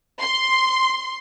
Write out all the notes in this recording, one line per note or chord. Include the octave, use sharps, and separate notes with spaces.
C6